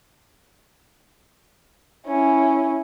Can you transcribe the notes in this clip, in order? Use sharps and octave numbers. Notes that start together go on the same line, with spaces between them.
C#4 E4